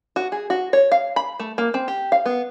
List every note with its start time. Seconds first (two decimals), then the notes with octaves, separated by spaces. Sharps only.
0.16 F#4
0.32 G#4
0.50 F#4
0.73 C#5
0.92 F5
1.16 B5
1.40 A3
1.58 A#3
1.74 C4
1.88 G4
2.12 F5
2.26 B3